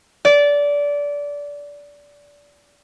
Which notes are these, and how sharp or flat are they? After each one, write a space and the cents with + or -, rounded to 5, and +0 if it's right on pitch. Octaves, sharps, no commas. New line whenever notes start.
D5 -20